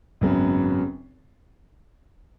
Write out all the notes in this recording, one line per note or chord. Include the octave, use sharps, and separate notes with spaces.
G#1 F#2 C#3 F#3 B3